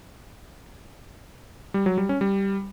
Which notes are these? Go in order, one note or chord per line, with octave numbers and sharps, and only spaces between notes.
G3
F#3
G3
C#4
G3